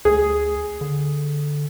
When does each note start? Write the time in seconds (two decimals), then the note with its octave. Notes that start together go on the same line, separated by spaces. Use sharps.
0.05 D2 G#4
0.81 D3